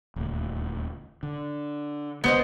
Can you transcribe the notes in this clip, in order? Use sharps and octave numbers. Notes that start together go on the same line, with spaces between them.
D#1 D2
D3
C2 D3 G#3 B3 C5 D#5